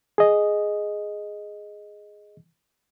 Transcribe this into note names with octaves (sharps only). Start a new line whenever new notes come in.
G#4 D#5